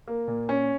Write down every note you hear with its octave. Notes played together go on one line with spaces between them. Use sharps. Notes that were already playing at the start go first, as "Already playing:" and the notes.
A#3
A#2
C#4